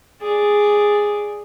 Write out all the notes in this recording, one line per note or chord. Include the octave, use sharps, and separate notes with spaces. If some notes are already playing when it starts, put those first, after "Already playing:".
G#4 D5